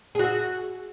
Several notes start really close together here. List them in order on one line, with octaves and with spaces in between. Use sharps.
G#4 F#4 E5